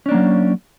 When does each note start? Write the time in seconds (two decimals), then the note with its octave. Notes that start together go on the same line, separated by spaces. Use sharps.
0.06 C#4
0.09 D4
0.11 A#3
0.14 F#3